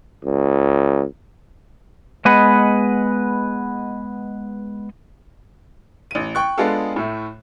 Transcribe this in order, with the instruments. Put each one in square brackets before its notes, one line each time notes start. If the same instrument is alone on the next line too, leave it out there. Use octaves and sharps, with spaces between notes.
[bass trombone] C#2
[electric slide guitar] G#3 B3 G#4 B4 D#5 F#5
[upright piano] A1 D#7
G5 C#6 F#6
G#3 B3 D4 F4 G#4 A4
A2 A3